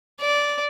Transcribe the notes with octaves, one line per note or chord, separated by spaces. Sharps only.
D5